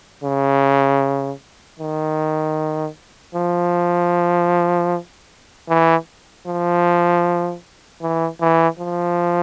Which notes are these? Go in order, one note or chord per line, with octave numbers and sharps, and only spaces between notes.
C#3
D#3
F3
E3
F3
E3
E3
F3